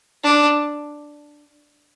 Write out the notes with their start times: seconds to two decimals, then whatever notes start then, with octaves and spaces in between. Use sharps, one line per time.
0.24 D4